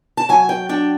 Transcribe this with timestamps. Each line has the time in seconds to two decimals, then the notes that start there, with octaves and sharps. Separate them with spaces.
0.17 A5
0.29 F#3 G#5
0.49 G5
0.69 D4 G5